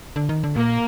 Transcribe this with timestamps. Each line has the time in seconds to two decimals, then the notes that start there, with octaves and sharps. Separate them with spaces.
0.16 D3
0.29 D#3
0.44 D3
0.56 A#2 A#3